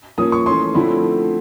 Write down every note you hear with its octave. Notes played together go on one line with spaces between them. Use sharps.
F3 A#3 C#4 D#6
C#6
E3 A3 C#4 C6
D3 F3 A3 C4 E4 B5